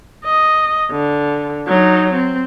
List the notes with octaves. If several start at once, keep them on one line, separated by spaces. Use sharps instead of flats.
D#5
D3
F#3 D#4
C4